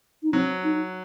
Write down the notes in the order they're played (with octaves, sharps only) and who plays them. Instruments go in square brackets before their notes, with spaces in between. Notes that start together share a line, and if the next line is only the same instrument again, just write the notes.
[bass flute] D#4
[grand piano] F#3 [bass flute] C4
[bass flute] D#4